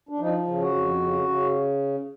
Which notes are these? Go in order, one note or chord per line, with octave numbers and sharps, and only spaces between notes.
D4
F3 D#4
C#3
F#4
F2
C#3
C#3